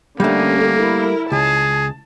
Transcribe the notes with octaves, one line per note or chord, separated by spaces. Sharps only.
D3 G3 A3 A#3 C#4 G4
E4 A#4
C#2 G#4 A5